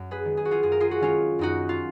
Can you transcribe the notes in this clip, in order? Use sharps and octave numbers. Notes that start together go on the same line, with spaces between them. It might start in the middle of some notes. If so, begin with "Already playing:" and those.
Already playing: F#2
G#4 B4
D#3 G#3
G#4
F#4
F4 G#4
F#2 G#4
A#4
F4 G#4
F#4
D#3 G#3 C#4 F4
F#2 D#4 F#4
F4